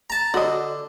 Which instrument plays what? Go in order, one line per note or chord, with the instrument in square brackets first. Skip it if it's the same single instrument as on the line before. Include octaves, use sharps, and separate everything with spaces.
[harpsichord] A5 A#5
[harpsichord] D3 [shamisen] F#4 D#5